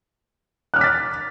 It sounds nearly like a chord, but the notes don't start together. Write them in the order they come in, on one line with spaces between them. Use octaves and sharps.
F#6 F6 D6 B6 A6